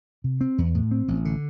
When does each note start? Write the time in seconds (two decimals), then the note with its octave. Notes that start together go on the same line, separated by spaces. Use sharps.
0.24 C3
0.41 C4
0.58 E2
0.75 A2
0.91 C4
1.08 A1
1.25 D3